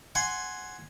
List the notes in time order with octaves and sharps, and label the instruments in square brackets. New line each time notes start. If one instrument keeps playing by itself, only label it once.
[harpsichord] F#5 G#5 C6